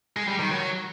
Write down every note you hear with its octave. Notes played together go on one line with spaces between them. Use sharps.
G#3
G3
D#3
F#3